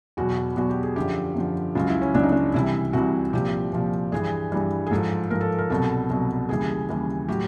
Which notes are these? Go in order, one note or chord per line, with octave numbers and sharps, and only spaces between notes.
E2 B2 F#3 F#4
E2 B2 F#3 F#4
G4
G#4
F#2 D3 F3 G4
F#2 D3 F3
C#2 C#3 F#3 F4
E4
C#4
C#2 C#3 F#3 D4
D#4
D4
C2 C3 E3 G3 E4
C2 C3 E3 G3 F#4
C2 A#2 F3 G4
C2 A#2 F3
G2 E3 G3 G#4
G2 E3 G3
G#4
G#2 F3 A4
G#2 F3 A#4
A4
A#4
C2 B2 F#3 A4
C2 B2 F#3
D#2 C#3 E3 G3 G#4
D#2 C#3 E3 G3
A2 F#3 G4